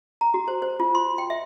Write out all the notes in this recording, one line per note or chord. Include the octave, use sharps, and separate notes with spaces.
A#5
F#4
C5
C5
F4
C6
G5
E5